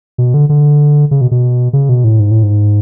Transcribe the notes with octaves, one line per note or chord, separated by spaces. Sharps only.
B2
D3
D3
C#3
B2
B2
C#3
B2
A2
G#2
A2
G#2